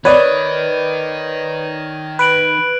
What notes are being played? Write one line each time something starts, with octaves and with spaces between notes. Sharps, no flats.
D#3 B4 C#5 D5 D#6 G#6 D#7
B4 F#6 D7 F#7